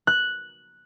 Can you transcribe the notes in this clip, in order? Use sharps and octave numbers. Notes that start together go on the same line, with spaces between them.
F#6